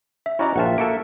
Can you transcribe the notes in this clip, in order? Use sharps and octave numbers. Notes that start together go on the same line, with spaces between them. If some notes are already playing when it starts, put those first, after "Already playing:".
E5
C#4 E4 F#4 D5 D#5 A#5
A#1 F4 E5 F#5 G5 A5
A#3 F#4 A4 A5 C#7 D7